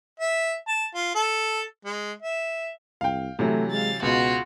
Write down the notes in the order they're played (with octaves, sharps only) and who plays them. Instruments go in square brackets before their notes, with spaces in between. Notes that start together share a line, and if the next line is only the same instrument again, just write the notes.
[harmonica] E5
A5
F4
A4
G#3
E5
[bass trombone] C2 [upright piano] F5 G5
[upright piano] C3 E3 F#3 [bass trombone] A3
[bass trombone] G#3 [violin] F5 A6
[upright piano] C#2 [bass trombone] B2 [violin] F4 F#4